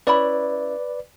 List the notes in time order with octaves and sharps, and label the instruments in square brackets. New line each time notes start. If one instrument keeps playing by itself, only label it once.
[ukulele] C#4 E4 B5 [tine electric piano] B4 D5